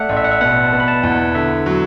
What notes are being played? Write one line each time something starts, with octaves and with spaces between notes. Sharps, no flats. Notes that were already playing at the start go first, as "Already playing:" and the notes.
Already playing: A3 D5 E5 F#5
A1
E5
F#5
E5
B2 F#5
A5
B3
B5
A5
E2
F#5
D3 E5
F#3